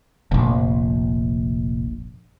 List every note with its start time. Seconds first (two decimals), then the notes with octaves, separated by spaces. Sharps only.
0.31 F1 A#1